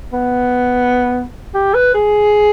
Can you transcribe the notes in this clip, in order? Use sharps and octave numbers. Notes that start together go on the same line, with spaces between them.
B3
G4
B4
G#4